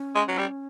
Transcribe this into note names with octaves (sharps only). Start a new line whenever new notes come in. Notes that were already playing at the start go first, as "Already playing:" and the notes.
Already playing: C#4
G#3
F#3
G3